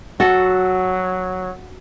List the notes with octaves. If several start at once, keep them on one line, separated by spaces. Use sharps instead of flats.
F#3 F#4 A4